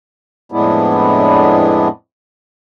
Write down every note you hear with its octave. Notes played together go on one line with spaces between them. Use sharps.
F2 A2 G#3 B3 D4 E4